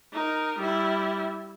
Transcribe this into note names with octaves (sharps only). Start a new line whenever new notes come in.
D#4 A#4
G3 E4